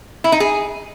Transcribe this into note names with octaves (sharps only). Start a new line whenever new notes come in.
E4
D#4
G#4